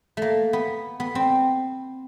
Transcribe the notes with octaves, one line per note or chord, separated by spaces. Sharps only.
A3 A#3
B3
B3
C4